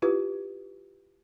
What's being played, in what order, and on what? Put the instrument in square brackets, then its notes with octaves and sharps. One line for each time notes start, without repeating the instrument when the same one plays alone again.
[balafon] E4 F4 G4 B4